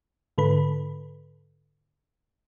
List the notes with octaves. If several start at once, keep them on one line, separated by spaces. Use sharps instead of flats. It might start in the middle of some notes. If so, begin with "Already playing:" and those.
G#2 D3 A4 B4 B5